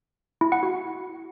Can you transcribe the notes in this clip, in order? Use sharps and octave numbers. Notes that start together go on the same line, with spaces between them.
E4
F#5
F#4